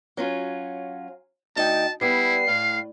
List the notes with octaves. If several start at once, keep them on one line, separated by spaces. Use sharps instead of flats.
F#3 C#4 F4
D2 D#4 G5 A5
G3 B3 E4 C7
A2 F5